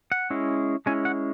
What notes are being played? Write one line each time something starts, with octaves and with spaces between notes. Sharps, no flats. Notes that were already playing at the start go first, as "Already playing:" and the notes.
F#5
G#3 C#4 E4
G#3 C#4 E4 G#5
F#5